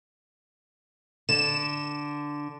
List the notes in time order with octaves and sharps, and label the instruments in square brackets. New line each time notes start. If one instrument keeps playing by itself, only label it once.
[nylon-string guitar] D3 [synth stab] E7